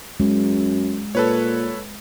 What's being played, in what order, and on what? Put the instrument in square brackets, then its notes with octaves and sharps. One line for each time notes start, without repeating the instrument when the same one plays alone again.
[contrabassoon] F#2 [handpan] G#3
[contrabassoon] A#2 [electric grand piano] A4 B4 C#5